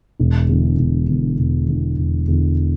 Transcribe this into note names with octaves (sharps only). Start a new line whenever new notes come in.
E1
E2 D3
E1
E2 D3
E1
E2 D3
E1
E2 D3